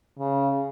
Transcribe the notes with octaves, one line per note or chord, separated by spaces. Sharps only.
C#3